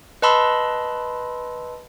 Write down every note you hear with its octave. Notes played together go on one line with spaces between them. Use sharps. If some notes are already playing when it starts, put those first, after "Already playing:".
B4 D#5 A5 B5 C6 E6